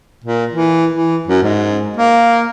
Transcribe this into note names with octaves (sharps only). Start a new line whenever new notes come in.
A#2
E3
E3
F#2
G#2
A#3